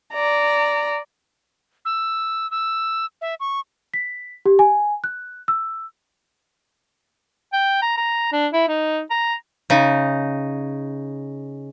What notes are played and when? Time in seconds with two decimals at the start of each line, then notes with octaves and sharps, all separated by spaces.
0.13 D5 A#5
1.85 E6
2.51 E6
3.21 E5
3.40 C#6
3.94 B6
4.46 G4
4.59 G#5
5.04 F#6
5.48 E6
7.53 G5
7.82 A#5
7.97 A#5
8.32 D4
8.53 E4
8.68 D#4
9.11 A#5
9.70 C#3 D#4